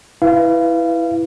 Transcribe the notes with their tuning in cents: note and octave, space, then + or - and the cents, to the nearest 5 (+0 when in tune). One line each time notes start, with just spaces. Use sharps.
E4 +0 B4 +0 F5 -25